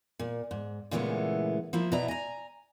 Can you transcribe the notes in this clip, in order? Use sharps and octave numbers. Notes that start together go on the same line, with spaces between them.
A#2
G#2
A#2 C#3 E3 G#3 A3 B3
F3 A#3 E4
B2 B3 D5 E5 A#5
G#5 A#5